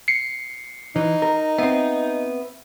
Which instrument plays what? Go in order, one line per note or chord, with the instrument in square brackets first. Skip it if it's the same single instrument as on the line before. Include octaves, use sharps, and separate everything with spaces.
[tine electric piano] C7 C#7
[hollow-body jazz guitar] E3 [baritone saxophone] D#4
[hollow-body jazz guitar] A#4
[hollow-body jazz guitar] B3 C4 [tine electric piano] E5